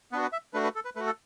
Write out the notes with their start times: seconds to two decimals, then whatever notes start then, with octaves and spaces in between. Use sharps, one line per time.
0.12 B3 D4 F#4 B4
0.22 B4
0.32 E5
0.53 A3 D4 F#4 B4
0.64 B4
0.75 A4
0.85 B4
0.96 A3 F#4 B4
1.06 A4